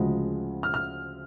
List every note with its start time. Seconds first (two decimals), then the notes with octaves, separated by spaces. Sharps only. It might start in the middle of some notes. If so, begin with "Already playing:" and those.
Already playing: D2 C#3 F3 G#3
0.63 F6
0.74 F6